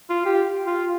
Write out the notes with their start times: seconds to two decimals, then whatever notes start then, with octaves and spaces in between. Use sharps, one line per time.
0.10 F4
0.26 G4
0.67 F4